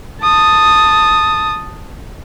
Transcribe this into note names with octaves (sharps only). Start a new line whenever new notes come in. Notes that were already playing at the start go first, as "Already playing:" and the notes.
A5 D#6